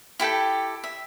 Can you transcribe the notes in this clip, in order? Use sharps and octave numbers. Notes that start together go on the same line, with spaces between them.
E4 G4 A4 G5
E5